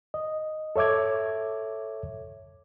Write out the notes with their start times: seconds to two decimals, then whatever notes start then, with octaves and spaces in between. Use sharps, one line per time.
0.14 D#5
0.76 A4 C#5 E5 D6 G#6